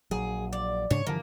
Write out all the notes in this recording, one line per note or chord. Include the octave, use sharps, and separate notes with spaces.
A#1 F#3 G#4
D5
G#2 C#3 D4 C#5
G2 D3 E3 F3 A#3